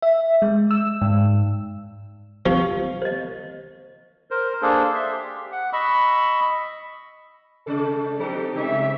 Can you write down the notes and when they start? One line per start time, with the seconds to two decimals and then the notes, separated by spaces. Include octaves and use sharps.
0.02 E5
0.42 G#3
0.71 E6
1.01 G#2
2.46 F3 D#4 G4 F5
3.02 C5 D#5
4.31 A#4 C5
4.62 A#3 D4 G#4 A4 C5
4.95 E5 C6
5.12 G4
5.52 F#5
5.73 D#5 B5 C#6 E6
7.67 C3 G#3 A4 D5
8.19 F3 C4 D#4 G4 A4
8.55 C#3 G3 D4 G4 E5